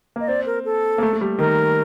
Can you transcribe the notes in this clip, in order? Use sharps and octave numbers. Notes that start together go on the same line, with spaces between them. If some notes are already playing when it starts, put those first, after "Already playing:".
A#3 D#5
C4 D5
A#4
A4
A#3
A3
A3
G3
D#3 A#4